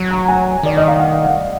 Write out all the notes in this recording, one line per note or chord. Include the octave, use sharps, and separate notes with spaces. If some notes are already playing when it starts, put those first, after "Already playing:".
Already playing: F#3
A#5
G#5
D#3 D5
D#5
F5
F#5